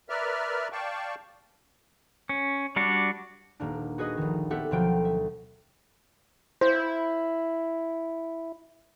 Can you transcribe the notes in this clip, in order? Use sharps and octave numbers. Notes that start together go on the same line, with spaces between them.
A#4 B4 D5 E5 F6
D5 F5 G5 A5 C#6
C#4
G3 D4 F#4
D#1 A#3 D4
F#4 G#4 B4 D#5 C#6 D#6
A#1 D#3
B3 C4 G4 A4 E5 F#5
D2 B2 F3 F#3 G5 D7
E5
E4 C5